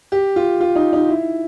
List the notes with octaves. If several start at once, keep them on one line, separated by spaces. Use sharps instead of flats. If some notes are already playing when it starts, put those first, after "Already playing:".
G4
F4
F4
D#4
D#4
E4